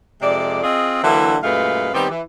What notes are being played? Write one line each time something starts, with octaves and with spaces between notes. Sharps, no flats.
F2 C3 G#3 D5
C4 F4 G#4 D#5
D3 E3 F#3 A#3 D4 E4
F#2 A#2 G#3 A3 B4 F5
D#3 G3 B3 C4 G4
E3